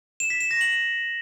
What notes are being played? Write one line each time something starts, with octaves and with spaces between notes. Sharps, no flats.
E7
B6
E7
A#6
F#7